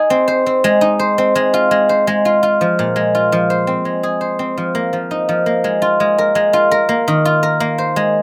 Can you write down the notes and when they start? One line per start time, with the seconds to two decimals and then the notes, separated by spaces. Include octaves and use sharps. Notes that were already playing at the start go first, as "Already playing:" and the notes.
Already playing: D#4 G#4
0.10 C4
0.28 C5
0.46 C4
0.64 G#3
0.81 D#4
0.99 C5
1.18 C4
1.35 G#3
1.54 F4
1.71 G#3
1.89 C5
2.07 G#3
2.25 F4
2.43 F4
2.61 F3
2.79 A#2
2.96 G#3
3.15 F4
3.32 F3
3.50 C5
3.67 C4
3.85 G#3
4.03 G#4
4.21 C5
4.39 C4
4.57 F3
4.75 A#3
4.93 F3
5.11 D#4
5.29 F3
5.46 A#3
5.64 G#3
5.82 F4
6.00 G#3
6.18 A#4
6.35 G#3
6.53 F4
6.71 A#4
6.89 A#3
7.08 D#3
7.25 F4
7.43 A#4
7.60 A#3
7.78 C5
7.96 G#3